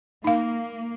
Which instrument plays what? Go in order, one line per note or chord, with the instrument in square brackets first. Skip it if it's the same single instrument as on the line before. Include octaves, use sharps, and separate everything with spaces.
[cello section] A#3 [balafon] D#4 F5